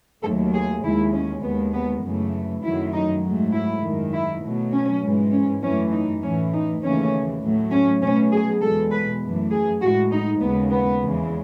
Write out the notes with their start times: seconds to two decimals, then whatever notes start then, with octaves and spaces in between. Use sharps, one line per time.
0.23 D#2 D#3 F#3 A3 A4
0.54 G#4
0.83 D#2 D#3 G#3 E4
1.13 C#4
1.43 D#2 D#3 G#3 B3
1.73 B3
2.03 F#2 C#3 E3 A3
2.63 F#2 D#3 F#3 A3 E4
2.93 D#4
3.23 G#2 F#3 A3
3.53 E4
3.83 F#2 D#3 G#3
4.12 E4
4.42 B2 F#3 A3
4.72 C#4
5.02 G#2 E3 G#3
5.32 C#4
5.62 F#2 E3 A3 C#4
5.92 D#4
6.22 A2 E3 A3 C#4
6.53 D#4
6.81 D#2 C#3 E3 A3 C#4
7.42 A2 F#3 A3
7.71 C#4
8.02 B2 F#3 A3 C#4
8.32 G#4
8.61 E2 B2 G#3 A4
8.92 B4
9.21 F#2 E3 A3
9.51 G#4
9.81 A2 G#3 F#4
10.11 D#4
10.41 D#2 C#3 G#3 B3
10.71 B3
11.01 E2 C#3 E3 G#3